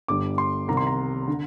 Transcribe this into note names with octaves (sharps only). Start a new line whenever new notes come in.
G1 G2 D3 G3 D6
C6
C2 C3 D#3 A#5
C6
A#5
D3